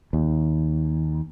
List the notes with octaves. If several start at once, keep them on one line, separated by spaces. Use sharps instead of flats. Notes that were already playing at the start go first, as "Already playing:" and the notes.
D#2